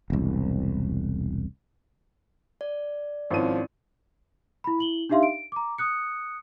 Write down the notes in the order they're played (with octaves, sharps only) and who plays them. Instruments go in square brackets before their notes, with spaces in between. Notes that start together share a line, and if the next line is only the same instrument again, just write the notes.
[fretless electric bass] E1 C2
[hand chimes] D5
[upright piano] G#1 C#4 D#7 [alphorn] F3 [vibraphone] C4 E4
[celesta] E4 B5
E4 F#7 G7
D4 D#4 G4 E5 F5 C6
D7
A#5 D6
D#6 F#6 C#7